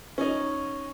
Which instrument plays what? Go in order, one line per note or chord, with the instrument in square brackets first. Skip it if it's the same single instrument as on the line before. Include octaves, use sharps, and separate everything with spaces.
[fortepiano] C#4 D#4